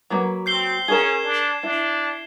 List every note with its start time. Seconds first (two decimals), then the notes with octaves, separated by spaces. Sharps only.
0.10 F#3 A#3 B4
0.46 C4 G6 C7 G7
0.88 C#4 G#4 A#4 G#6 E7
1.24 D4
1.63 D4 E4